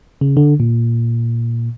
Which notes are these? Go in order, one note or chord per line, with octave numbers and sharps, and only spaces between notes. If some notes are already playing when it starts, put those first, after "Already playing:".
C#3
D3
A#2